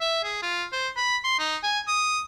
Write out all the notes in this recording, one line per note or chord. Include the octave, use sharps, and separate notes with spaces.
E5
G#4
F4
C5
B5
C6
D#4
G#5
D#6